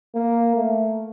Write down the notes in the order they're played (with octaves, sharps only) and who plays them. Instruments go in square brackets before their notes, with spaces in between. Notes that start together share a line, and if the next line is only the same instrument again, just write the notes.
[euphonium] A#3
A3